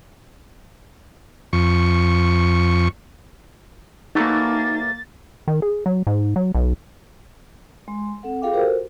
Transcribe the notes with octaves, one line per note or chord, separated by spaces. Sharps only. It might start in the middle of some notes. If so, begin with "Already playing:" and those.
F2 C#6
E3 F#3 A3 A#3 D#4 A6
D#3
G#4
F#3
G#2
F#3
B1
G#3 C6
C4 A4 F#5
F4 G#4 A4 F5 G5 D6
F#4 G4 A4 A#4 C5